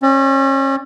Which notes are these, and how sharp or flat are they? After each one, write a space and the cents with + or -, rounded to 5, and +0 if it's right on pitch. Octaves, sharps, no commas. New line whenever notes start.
C#4 -35 D5 +0